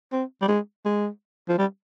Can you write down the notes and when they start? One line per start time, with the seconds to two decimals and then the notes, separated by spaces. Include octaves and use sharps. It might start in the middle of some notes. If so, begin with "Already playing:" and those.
0.13 C4
0.42 G3
0.48 G#3
0.85 G#3
1.49 F3
1.58 G3